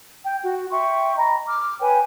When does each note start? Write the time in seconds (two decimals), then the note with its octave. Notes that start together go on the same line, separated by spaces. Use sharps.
0.24 G5
0.44 F#4
0.71 E5 G5 C6 C#6
1.17 D#5 A#5 B5
1.48 D6 F6
1.80 B4 C#5 G5 G#5